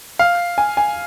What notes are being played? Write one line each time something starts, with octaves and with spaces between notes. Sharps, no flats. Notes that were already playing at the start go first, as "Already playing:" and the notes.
F5
G#5
G#5